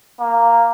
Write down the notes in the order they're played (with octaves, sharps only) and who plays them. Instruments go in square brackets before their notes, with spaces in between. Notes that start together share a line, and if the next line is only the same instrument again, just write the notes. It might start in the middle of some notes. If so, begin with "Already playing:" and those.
[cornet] A#3